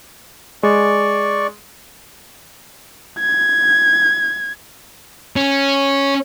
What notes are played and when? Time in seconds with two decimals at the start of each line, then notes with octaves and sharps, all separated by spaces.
0.63 G#3 D5 C#6
3.19 G#6
5.36 C#4